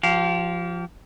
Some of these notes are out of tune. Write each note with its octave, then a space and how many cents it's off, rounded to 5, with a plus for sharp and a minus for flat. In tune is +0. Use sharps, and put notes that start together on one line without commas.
F3 +0 G4 -35 F5 +0